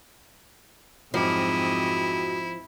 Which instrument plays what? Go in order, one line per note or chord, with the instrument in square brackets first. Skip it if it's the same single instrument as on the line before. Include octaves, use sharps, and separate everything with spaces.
[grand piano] F2 F#3 D6 [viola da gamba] G#2 C4 D#5 [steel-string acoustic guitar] F3 [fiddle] E4